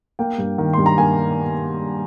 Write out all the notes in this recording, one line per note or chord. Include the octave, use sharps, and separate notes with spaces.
A#3 G5
G2
D#3
G2 C6
A#5
A#3 G#5